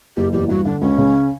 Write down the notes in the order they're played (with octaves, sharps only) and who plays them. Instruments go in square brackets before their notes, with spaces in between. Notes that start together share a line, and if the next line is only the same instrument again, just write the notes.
[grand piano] F#1 [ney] G4
[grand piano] E2 [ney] G4
[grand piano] G2 [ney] F#4
[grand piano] D3 [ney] D4
[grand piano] C#2 [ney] C#4
[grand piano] C#3